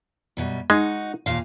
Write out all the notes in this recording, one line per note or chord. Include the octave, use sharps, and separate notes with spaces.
F#2 B2 G3
G#3 D#4 F#4
D#2 A#2 F5